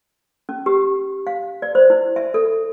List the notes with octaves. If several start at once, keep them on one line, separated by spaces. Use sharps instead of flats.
C#4
G4
F5
D5
C5
E4
E5
A4